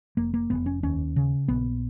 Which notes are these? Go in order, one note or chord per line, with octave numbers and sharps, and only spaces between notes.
F1 A#3
A#3
F1 B3
C#4
D#2 C#4
C#3
A#1 B3